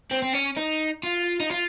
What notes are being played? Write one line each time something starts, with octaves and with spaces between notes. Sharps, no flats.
C4
C4
C#4
D#4
F4
D#4
F4